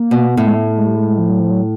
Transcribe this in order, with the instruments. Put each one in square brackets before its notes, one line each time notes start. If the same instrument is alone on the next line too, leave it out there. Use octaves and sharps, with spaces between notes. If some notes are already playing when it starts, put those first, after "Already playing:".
Already playing: [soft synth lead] A#3
[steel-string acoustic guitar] B2
[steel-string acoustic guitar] A2 [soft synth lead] A3
[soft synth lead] G#3
A3
G#3
G3
G#3
F3
F#3
F3
F#3